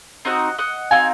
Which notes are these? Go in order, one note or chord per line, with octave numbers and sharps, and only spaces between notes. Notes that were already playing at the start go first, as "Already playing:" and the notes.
C4 D#4 F#4 D#5 F#5
D#5 F#5
C4 D#4 F#4 F5 G#5